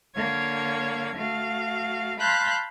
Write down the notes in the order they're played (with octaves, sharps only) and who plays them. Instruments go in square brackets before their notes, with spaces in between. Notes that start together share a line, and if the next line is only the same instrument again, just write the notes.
[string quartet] D3 A#3 C#5 F5 G#6
A3 F#4 F5
F5 A5 B5 C6 F#6 G6